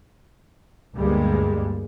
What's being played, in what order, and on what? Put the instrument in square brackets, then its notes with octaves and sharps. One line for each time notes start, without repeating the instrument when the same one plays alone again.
[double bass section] D2 G2 G3 G#3 A#3